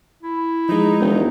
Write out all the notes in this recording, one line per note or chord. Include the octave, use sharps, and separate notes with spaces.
E4
F3 G#3 D#4
E1